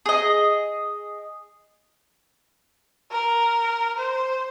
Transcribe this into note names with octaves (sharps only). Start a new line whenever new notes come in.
G#4 D#5
A#4
C5